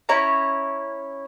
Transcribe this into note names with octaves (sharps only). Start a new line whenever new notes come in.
C#4 E4 C#5 A#5